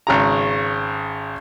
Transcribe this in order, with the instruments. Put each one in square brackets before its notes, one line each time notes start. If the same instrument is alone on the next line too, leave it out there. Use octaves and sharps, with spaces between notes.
[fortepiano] G#1 C#3 A#5